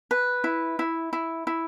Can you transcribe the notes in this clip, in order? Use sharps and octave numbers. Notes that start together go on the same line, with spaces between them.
B4
E4
E4
E4
E4